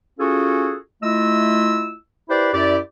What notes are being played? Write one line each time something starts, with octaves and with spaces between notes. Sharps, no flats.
C#4 F4 F#4 G#4 A4
A3 E4 F4 D#5 E6
E4 G4 B4 C5 D5
F#2 E4 G4 D5